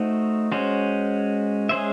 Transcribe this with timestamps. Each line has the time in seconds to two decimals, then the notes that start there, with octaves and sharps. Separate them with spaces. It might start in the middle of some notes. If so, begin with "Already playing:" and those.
Already playing: A3 D#4 F#4 C5 D#5
0.52 G#3 C#4 F#4 C5
1.69 G#3 C#4 G#4 C5 E5